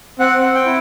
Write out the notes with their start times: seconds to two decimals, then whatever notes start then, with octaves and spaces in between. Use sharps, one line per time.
0.19 C4 F#5
0.42 C4
0.55 G5
0.66 E4